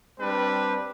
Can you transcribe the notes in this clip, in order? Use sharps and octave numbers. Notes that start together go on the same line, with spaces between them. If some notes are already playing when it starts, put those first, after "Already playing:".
G3 C4 D4 B4